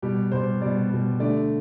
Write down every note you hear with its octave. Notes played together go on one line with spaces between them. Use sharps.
B2 G3 G4
B2 G3 C5
B2 G3 D5
B2 G3
D3 A3 D5